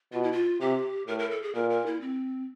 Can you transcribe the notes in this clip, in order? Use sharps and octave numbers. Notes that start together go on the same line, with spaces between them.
B2 F4
E4
F4
C3 G4
A2 A#4
A#4
A4
G#4
A#2 A#4
A#4
E4
C4